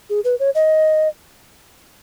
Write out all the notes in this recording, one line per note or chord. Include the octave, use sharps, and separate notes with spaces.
G#4
B4
C#5
D#5